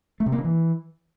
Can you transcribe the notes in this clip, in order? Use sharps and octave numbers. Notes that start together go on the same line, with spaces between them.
A3
C3
A#3
C#3
E3